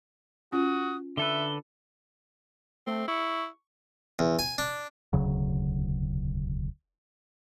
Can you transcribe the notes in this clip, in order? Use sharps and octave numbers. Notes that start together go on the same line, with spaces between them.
C#4 F4 F#4 D#6
D3 A4 B4 E5 G7
A3 C4
E4 C#6
E2
G#5
D4
E1 D2 C#3 F#3